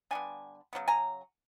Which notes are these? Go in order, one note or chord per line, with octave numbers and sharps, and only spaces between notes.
D3 G3 B3 G#5
C#3 F#3 B3
G#5 A#5